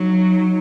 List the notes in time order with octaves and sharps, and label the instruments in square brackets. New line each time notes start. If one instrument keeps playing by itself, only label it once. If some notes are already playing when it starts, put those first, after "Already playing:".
Already playing: [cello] F#3 [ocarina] D#4